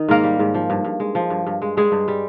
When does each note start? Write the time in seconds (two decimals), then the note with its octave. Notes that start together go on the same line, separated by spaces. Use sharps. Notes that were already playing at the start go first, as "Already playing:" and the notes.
Already playing: D#3 D#4
0.08 G#2 A#3 A#4
0.24 G3
0.39 G#2
0.54 F3
0.70 G2
0.85 G2
1.00 G#3
1.15 F3
1.30 G2
1.47 G2
1.62 G#3
1.77 G3 G#3 G#4
1.92 G2
2.08 G3